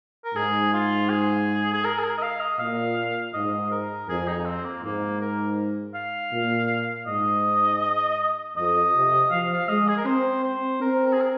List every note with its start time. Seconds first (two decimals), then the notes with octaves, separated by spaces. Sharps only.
0.25 A#4
0.35 G#2 G#4
0.73 F4
1.09 G#4
1.74 G#4
1.84 A#4
1.99 G#4
2.04 A#4
2.18 D#5
2.22 F5
2.40 D#5
2.59 A#2 F5
3.34 G#2 D#5
3.71 A#4
4.08 F2 G#4
4.27 D#4
4.46 C4
4.65 A#3
4.83 G#2 A#3
5.21 A#4
5.95 F5
6.32 A#2
7.07 G#2 D#5
8.56 F2 D#5
8.95 C3
9.31 F3 F5
9.53 F5
9.69 G#3 D#5
9.88 G#4
9.97 A#4
10.06 C4 C5
10.43 C5
10.81 C4 A#4
11.06 A#4
11.12 G#4
11.21 A#4